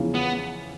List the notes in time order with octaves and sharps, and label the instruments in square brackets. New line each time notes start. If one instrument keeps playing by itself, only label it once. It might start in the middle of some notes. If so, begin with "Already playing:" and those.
Already playing: [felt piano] E2 C#3 F3
[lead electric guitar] B3